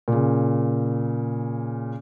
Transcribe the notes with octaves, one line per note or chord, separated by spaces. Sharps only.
A#2 C#3